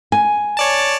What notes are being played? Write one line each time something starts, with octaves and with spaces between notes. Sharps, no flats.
G#5
C#5 D5 A5